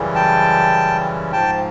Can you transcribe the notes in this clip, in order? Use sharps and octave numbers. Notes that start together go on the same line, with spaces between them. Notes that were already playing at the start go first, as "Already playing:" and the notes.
Already playing: F#2 C#3 E3 G3
G5 A5
G#2 F3 G5 A5